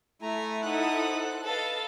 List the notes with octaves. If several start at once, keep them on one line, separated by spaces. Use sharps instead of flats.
A3 E4 G#5 A#5
D#4 A4 C5 F#5 D#6 F#6
A4 B4 D#5 F5 A5